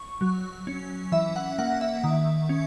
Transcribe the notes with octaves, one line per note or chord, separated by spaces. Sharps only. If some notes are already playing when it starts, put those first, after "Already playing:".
Already playing: C#6
F#3
C#4
E3 E5
F#5
A#3 F#5
E5
D#3
C#4